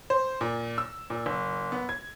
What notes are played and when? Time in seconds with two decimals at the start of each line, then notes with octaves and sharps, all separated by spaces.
0.10 C5
0.41 A#2
0.78 E6
1.10 A#2
1.26 F#1
1.72 B3
1.89 G#6